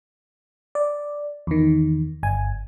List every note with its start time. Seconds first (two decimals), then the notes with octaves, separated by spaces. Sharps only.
0.75 D5
1.47 E2 D#3
2.23 G1 G#5